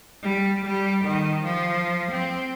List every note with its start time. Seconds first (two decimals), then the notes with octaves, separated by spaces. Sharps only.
0.23 G3
0.65 G3
1.05 D#3
1.44 F3
2.11 C4